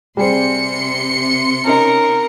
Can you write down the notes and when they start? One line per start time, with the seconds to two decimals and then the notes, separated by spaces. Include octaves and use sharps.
0.17 C3 G3 G#4 C5 C6 C#7
1.65 C#4 D#4 A#4